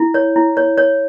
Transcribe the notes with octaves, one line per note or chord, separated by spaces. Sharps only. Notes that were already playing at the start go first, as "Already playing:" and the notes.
Already playing: E4
C#5
E4
C#5
C#5